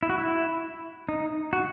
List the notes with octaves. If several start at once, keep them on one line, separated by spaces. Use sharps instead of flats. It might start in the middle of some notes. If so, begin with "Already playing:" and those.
E4
F#4
E4
D#4
F#4